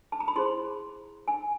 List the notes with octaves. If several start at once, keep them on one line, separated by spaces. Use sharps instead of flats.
A5
A#5
B5
E4 G#4 C5 C6
G#5